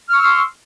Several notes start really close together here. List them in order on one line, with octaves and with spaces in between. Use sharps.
F6 C#6 E6 C6